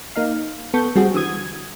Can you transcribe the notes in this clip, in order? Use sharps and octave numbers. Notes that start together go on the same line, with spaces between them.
A#3 D#4 F5
B3 A4 C#6 G6
G3 C4 F#4 G#4
D3 E3 D#6 G#6